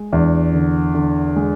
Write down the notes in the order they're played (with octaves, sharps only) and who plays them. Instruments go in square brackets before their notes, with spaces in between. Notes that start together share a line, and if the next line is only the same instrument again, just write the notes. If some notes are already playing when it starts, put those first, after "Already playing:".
Already playing: [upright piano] G#3
[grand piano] E2 [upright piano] D4
[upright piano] D3
D3
G#3